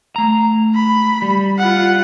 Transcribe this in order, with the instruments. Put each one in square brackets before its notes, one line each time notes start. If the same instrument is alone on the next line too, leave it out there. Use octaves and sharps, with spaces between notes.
[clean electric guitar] A3 A#5
[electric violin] B5
[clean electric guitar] G3
[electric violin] F4 F#5